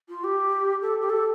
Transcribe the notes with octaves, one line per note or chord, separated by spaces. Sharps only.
F4
G4
A4
G4
A4